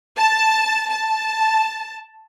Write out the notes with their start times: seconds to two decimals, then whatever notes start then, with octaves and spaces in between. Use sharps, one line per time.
0.17 A5
0.90 A5